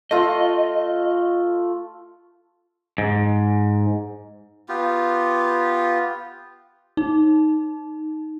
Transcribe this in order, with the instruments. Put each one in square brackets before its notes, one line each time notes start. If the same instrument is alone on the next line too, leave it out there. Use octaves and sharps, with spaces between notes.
[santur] A3 F4 [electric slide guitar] D#5
[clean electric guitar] G#2
[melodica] B3 F4 G4
[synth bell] D#4